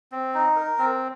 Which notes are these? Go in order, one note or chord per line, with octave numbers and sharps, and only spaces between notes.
C4
D#4
A#4
C4